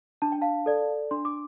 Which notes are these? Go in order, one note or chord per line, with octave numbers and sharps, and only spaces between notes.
D4 A5
G5
F5 A5
A4 D5
D4 C6
D6